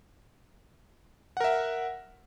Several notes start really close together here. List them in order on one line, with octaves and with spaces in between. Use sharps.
F#5 A#4 E5